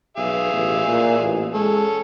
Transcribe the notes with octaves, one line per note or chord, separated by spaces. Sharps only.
B1 G#4 E5 F5
A1
A#2
A1
G#3 C#4 A4